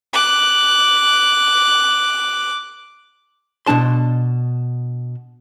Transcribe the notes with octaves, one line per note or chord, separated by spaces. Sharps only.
D6 F#6
B2 G#3 D4 A5 C6